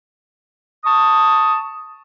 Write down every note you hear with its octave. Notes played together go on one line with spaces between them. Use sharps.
A5 C#6 D#6